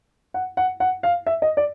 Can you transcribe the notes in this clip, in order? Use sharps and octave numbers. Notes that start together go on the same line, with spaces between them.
F#5
F#5
F#5
F5
E5
D#5
D5